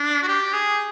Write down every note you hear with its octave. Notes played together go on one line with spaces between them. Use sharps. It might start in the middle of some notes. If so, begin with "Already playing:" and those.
Already playing: D4
F#4
G4
G#4